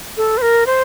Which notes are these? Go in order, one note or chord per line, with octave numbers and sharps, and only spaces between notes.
A4
C5
A#4
C5